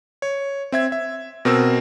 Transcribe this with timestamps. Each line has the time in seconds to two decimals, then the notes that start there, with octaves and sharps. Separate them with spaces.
0.22 C#5
0.72 C4 E5 G#6
0.92 E5
1.45 B2 C4 A#4 C5 E6